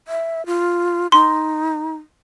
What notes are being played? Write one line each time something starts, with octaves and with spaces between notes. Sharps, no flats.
E5
F4
D#4 C6